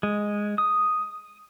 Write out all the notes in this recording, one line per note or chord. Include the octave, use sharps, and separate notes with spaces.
G#3
D#6